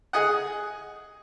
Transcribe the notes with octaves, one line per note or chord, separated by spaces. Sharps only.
G#4 D#5 F#5